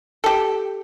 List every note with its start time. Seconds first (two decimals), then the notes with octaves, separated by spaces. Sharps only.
0.24 G4 A4